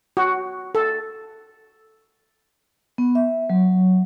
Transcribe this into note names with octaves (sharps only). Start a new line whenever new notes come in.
F#4
A4
B3
E5
F#3